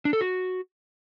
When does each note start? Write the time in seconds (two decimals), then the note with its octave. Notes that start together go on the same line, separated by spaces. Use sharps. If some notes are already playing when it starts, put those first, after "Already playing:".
0.05 D4
0.13 A4
0.21 F#4